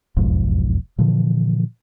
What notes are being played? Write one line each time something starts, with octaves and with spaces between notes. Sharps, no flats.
E1 B1 F2 G#2
A#2 D3 E3 F3